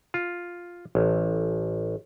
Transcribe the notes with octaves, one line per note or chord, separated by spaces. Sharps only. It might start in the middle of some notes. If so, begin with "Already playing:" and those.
F4
A1